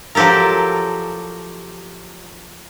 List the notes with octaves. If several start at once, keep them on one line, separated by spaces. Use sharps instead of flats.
F3 F#3 G4 A4 A#4